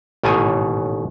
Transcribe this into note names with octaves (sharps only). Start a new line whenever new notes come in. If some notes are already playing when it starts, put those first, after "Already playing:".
A1 G#2 B2 D#3 A#3 G#5